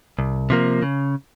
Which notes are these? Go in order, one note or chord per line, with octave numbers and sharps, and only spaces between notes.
C2
C3 F3 A#3
C#3